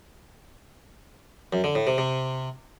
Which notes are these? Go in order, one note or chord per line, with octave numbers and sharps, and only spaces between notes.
F#2
D3
A2
C3
C3